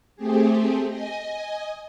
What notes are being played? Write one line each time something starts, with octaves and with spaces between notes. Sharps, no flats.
A3 C4 G4 G#4
D#5 G#5